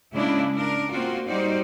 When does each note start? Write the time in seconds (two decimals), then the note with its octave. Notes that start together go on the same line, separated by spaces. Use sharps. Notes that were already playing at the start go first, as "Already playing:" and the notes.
0.14 C#3 G#3 A#3 D4 E4
0.54 D4 A#4
0.92 A#3 C4 F4 F#4
1.28 G3 D#4 F#4 C5 D5